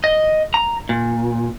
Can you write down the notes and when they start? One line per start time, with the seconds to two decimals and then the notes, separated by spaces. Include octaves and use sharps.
0.04 D#5
0.54 A#5
0.89 A#2